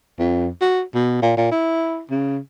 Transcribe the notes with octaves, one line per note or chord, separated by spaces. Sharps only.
F2
F#4
B2
A#2
A#2
E4
C#3